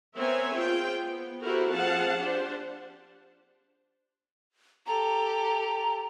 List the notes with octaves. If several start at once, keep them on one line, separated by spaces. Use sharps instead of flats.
B3 C4 A#4 C#5 E5 G#5
C4 F4 G#4 G5
B3
E4 F#4 G4 A4 A#4 C5
F3 C4 G#4 F5 F#5 A5
D4 G4 C5
G4 A4 A#5